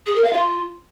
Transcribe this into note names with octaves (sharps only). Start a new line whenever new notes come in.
G#4
A#4
F5
F4